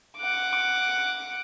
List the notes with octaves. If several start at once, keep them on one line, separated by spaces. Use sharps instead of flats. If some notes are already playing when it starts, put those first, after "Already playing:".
F#5 D6